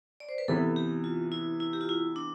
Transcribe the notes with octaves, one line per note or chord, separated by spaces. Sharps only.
D5
C5
B4
C3 E3 B3 A4
G4
F4
E4
E4
G4
F4
E4
D4